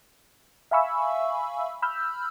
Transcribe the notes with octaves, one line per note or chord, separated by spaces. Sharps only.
E5 F5 G#5 B5 C#6 E6
B5 E6 F6 G6